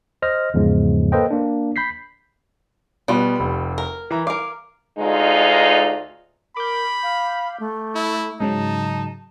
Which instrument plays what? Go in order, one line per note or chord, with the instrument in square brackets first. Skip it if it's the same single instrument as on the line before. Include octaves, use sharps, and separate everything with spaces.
[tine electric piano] C5 D#5 F6 A#6
E2 G#2 C#3 F3 G#3
A#3 A4 B4 C5 D#5 G5
A#3 D4
B5 G6 B6 C7
[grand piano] B2 B3 [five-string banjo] G3 F4
[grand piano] F1 B5
[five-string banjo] A#4
[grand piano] E3 E5 A#5
[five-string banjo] A#4 F5 [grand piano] D6
[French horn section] D2 G#3 D#4 F4
[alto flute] A#4 [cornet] B5 [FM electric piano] D6 G6
[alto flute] F5
A3
[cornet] E4
[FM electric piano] G#2 C#3 F#3 [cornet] D#4 [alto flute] A5